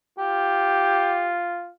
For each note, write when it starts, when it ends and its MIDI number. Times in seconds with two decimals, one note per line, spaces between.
0.18 1.70 65
0.18 1.33 67